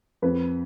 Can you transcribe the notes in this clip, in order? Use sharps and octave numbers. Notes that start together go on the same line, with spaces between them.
F2 B4